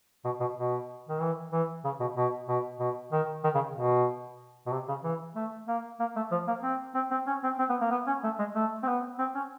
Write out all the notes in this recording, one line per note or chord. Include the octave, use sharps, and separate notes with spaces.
B2
B2
B2
D#3
E3
E3
C#3
B2
B2
B2
B2
D#3
D#3
C#3
B2
B2
C3
C#3
E3
A3
A#3
A#3
A3
F3
A#3
C4
C4
C4
C#4
C4
C4
B3
A#3
B3
C#4
A3
G#3
A3
C4
B3
C4
C#4